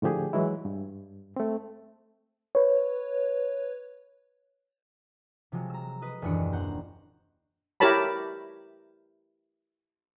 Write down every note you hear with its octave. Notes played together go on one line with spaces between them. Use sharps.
A2 D3 F3 G4 G#4
E3 F#3 G#3 E4
G2
A3 C4
B4 C#5
C3 F3 F#3 G#3
A#5 E6
B4 D#5
D#1 F#2 E3 G#3 D4 C#7
C5 F#5 G5 A#5
E4 G4 A#4 C#5 A5 B5